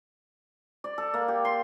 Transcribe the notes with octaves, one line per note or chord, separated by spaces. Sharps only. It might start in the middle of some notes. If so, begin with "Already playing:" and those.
D5
A4
A#3
G4
C6